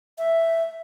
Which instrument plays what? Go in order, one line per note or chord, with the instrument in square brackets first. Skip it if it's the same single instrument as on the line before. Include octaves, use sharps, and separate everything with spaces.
[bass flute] E5